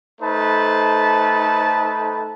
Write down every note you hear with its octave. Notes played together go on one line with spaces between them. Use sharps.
A3 D#4 A4 B4 C5 A5